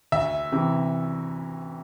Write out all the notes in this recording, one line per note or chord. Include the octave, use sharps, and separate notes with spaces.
D2 E5
C3 E3